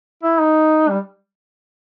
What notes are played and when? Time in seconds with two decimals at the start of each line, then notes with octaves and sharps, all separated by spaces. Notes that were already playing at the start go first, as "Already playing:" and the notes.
0.23 E4
0.40 D#4
0.89 G3